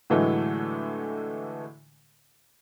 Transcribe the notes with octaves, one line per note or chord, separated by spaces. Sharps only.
A2 D3 E3 F#3 G#3 A3